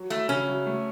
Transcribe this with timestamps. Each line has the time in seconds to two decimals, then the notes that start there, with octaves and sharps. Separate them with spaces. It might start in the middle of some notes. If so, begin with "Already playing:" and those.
Already playing: F#3
0.10 A3 E4
0.29 C#3 C#4
0.48 F#3
0.66 A3